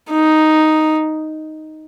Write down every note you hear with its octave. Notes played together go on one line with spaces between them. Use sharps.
D#4